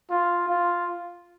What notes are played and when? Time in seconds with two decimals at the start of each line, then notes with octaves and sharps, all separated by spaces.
0.10 F4
0.49 F4